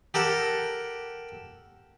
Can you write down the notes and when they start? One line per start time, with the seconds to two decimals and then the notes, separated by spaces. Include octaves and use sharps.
0.14 G4 A4 A#4 F#5